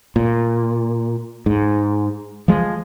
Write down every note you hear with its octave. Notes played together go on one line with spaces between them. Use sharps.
A#2
G#2
F3 G#3